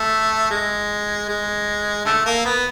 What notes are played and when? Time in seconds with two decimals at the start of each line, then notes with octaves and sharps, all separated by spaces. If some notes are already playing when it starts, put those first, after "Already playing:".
Already playing: A3
0.51 G#3
1.29 G#3
2.06 D3 A3
2.26 A#3
2.45 B3